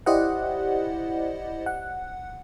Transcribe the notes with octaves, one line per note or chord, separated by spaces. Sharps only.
E4 G4 C5 D5 D#5 F#5
F#5